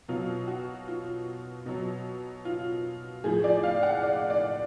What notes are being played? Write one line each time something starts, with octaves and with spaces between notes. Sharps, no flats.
B2 F#3 F4
F#4
F4
B2 F#3
F4
A2 F3 G#4
D5
F5
F#5
D5
D5